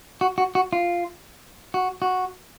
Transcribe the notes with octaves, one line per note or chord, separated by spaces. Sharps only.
F#4
F#4
F#4
F4
F#4
F#4